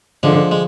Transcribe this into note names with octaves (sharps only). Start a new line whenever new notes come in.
D3 F3 G#3
G#3